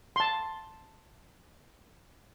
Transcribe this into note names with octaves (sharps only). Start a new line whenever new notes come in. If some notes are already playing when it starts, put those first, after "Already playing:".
A5 C6